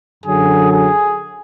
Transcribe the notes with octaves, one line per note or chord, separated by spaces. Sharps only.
F#2 D3 F#3 G#4
G#4